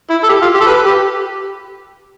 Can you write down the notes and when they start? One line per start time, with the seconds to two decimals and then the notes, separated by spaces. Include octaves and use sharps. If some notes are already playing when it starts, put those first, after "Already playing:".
0.10 E4
0.23 A4
0.29 G4
0.41 F4
0.54 G4
0.61 A4
0.66 B4
0.85 G4